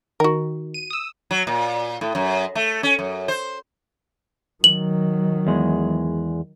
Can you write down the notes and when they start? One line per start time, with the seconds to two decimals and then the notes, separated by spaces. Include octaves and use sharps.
0.20 D#3 F#4 A#4
0.74 D#7
0.90 D#6 E6
1.31 F#3
1.47 A#2
2.01 A2
2.15 F#2
2.55 A3
2.83 C#4
2.99 F#2
3.28 C5
4.64 D#3 F#3 F#7
5.47 E2 G#3